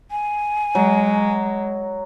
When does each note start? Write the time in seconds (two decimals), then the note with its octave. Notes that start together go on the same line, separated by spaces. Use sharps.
0.11 G#5
0.75 F#3 G#3